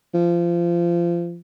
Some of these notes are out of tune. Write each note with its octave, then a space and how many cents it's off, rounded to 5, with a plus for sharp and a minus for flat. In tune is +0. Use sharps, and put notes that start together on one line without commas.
F3 -25